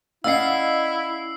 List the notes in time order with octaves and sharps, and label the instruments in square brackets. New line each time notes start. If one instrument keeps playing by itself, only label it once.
[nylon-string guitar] C#4 D5 F#5 [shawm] E4 [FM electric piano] D#5 F5 [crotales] E6 C7